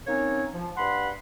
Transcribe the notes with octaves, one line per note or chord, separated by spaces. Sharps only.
A#3 C4 C#4 D#4 C#5
F3
G2 F#5 B5 C6